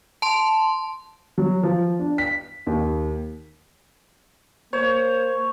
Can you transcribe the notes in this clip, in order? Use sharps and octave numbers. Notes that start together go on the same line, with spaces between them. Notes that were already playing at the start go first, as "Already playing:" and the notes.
A5 C6
F#3
F3
D4
B6
D#2
A#3 C5 C#5